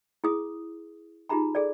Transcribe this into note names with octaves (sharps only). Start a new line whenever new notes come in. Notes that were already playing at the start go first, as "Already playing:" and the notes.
E4 G#4 D#6
D#4 F4 G4 G#4 A#5 B5
G#4 A4 D5